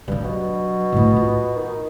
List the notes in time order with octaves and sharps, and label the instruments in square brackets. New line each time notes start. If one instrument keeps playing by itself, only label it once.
[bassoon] G2 [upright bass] F#3 D4
[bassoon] B2
[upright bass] A2 C4
F4
[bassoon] D#3